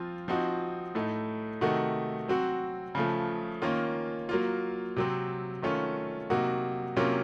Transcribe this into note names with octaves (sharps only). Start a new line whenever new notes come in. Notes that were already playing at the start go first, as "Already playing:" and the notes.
Already playing: F3 C4 F4
F3 C4 D#4 F#4
A2 A3 D#4
C3 D#3 A3 D#4 F#4
F#3 C4 F#4
C#3 F3 A3
D#3 A#3 C#4 F4
F#3 A#3 F4
C3 F#3 C4
D#3 A3 C#4 F4
C3 F#3 A#3 D#4 F#4
C3 F#3 A#3 C#4 F4